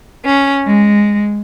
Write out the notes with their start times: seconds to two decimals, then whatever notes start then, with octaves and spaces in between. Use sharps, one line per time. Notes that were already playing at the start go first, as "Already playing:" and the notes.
0.24 C#4
0.67 G#3